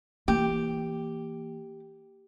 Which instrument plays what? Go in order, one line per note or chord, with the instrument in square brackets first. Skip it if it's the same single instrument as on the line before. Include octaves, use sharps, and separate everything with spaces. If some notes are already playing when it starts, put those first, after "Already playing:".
[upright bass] E3 A#3 [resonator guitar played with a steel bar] G4